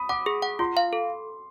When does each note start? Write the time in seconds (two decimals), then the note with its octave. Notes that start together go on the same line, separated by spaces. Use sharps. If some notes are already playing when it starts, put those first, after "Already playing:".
Already playing: B5 D#6
0.09 F#5 D6
0.26 G#4
0.42 F#5
0.59 F4 C6
0.77 F5
0.93 A4